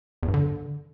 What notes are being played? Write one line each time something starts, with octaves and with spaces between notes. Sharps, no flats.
E2
G2
D3